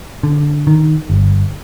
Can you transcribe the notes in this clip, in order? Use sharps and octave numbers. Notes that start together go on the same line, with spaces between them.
D3
D#3
G1